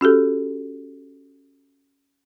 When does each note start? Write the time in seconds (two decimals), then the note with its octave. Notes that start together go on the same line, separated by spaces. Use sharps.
0.01 C#4 F#4 G4 A4